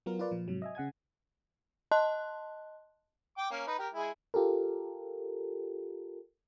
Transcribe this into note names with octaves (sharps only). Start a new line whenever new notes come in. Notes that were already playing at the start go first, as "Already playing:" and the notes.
F#3 B3 F4 A#4
F4 A#4 B4 D5 F5
A#2 F3
G#2 C3 F#3
D#5 E5 G#5
C#3 F#5 G#5 G#6
D#5 A5 C6 F#6
G5 D6
A#3 C#4
D#4 B4
G4 A#4
G#3 E4 G#4
F4 G4 A4 A#4